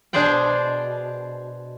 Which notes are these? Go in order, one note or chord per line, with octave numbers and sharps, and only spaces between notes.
B2 D4 G#4 C5 D5 G5